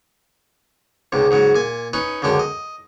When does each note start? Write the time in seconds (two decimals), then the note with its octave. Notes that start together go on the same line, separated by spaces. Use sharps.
1.12 C#2 G#2 C3
1.31 G#2 C#3 F#3
1.55 A#2 G#5
1.93 C#4 D#4 B4
2.22 C#2 F#2 D3 D4 G4
2.39 D#5